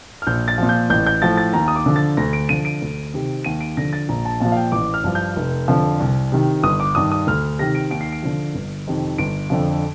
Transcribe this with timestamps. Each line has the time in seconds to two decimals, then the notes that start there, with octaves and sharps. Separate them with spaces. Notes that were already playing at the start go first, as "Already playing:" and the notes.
0.22 F6
0.27 A#1 G6
0.48 A6
0.58 A#2 F3
0.69 G6
0.90 A1 G6
1.06 G6
1.22 A2 F3 A6
1.37 A6
1.53 D#2 A#5
1.68 D#6
1.76 D6
1.86 D3 F3
1.96 A6
2.17 D2 A#6
2.33 D7
2.49 D3 F3 D#7
2.65 D7
2.82 D2
3.14 C3 D#3
3.44 D#2 D#7
3.61 D7
3.77 D3 F3 A#6
3.93 A6
4.09 A#1 A#5
4.25 A5
4.40 A#2 F3 A5
4.52 F5
4.57 G5
4.72 A1 D6
4.94 F6
5.04 G2 F3
5.15 G6
5.36 F1
5.68 F2 D3 F3
6.00 C2
6.32 C3 D#3
6.63 G1 D#6
6.80 D6
6.95 G2 D#3 D#6
7.12 D#6
7.27 D2 F6
7.59 C3 D#3 A#6
7.75 D7
7.91 D#2 D7
8.01 C7
8.12 D7
8.23 D3 F3
8.54 G1
8.87 F2 C3 D#3
9.18 G1 D7
9.50 F2 D3 F3